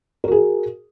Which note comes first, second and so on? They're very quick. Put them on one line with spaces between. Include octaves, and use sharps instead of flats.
A#4 F#4 G#4